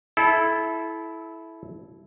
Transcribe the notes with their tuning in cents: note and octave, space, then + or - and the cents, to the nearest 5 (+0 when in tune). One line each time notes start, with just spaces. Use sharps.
E4 +0 A4 -30